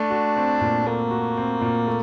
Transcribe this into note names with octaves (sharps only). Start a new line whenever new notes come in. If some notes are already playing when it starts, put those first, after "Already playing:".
Already playing: A3 D4
F#4
C4
A#2
A3 A#3
F#4
C4
A#2
A3